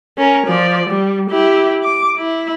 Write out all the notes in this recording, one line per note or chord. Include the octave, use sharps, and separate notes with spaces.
C#4 A#4
F3 D5
G3
E4 G4
D6
E4